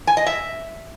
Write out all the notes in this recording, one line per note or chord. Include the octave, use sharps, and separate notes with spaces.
G#5
D#5
E5